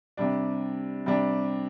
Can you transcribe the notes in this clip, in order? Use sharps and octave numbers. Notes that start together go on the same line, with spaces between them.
C3 G3 D4
C3 G3 D4